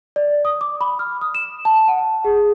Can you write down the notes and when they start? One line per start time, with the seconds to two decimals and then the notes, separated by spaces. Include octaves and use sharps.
0.16 D5
0.45 D#6
0.61 D6
0.81 B5
0.99 F6
1.21 D#6
1.35 E7
1.65 A5
1.88 F#5
2.25 G#4